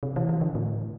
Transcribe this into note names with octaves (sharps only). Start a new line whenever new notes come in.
C3
E3
E3
D3
A2